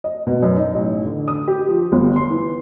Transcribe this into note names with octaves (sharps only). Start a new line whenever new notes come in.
D#5
B2
F#2
D#4
A1
D3
D#6
G4
F3
G1
C6
E3